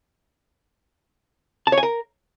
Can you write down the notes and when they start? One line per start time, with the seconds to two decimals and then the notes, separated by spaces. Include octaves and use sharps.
1.67 A5
1.72 C#5
1.78 G#5
1.83 A#4